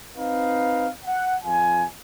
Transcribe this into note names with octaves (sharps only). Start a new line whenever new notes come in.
C4 D#4 B4 F5
F#5
F2 F4 G#5